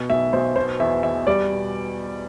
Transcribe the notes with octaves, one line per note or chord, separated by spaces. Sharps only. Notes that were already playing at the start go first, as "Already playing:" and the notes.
Already playing: B2
B1 E5
B1 C5
B2 C5
E2 E5
E2 E5
G3 D5
B2